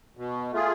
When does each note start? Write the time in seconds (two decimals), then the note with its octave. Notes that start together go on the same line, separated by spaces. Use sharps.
0.17 B2
0.52 A3 F4 G#4